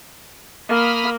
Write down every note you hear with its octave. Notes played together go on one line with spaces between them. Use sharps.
A#3 B5 D#6 F6